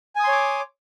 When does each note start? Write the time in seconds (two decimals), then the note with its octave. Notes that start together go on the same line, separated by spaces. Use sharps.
0.16 G#5
0.20 D#6
0.24 C6
0.28 C#5
0.32 D6